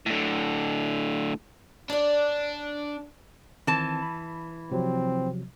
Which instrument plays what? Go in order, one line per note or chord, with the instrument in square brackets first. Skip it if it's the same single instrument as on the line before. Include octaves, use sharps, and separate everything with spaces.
[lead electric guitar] A2 D3
[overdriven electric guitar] D4 [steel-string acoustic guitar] C#5 D5
[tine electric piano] D#3 C4 [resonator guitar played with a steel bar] E3 A5
[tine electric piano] B5
[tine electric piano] C3 F3 F#3 [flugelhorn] C4